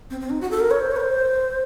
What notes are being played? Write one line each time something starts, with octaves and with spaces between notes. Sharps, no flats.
C4
C4
D#4
F#4
A4
A#4
C#5
C5
C#5
A#4
C5